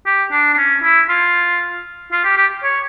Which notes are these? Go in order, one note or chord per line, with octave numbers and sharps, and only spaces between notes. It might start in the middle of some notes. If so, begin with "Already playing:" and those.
G4
D4
D4
C#4
E4
F4
F4
G4
G4
C#5